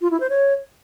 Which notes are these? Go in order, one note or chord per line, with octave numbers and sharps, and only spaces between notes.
F4
E4
C5
C#5